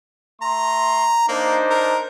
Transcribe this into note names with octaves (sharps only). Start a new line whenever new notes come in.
A3 A#5 C6
A#3 D4 D#4 C5
A#4